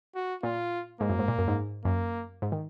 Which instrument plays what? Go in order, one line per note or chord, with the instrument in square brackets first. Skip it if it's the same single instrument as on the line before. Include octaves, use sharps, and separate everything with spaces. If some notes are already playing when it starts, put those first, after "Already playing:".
[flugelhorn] F#4
[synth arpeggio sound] A#2 [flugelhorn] F4
[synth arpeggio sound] G#2 [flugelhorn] A#3
[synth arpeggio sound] F#2
G#2
A#2
F#2
G#2
[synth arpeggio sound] F#2 [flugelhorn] A#3
[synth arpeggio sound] G#2
D#3